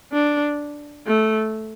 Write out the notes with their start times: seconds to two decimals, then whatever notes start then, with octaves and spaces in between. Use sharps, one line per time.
0.13 D4
1.07 A3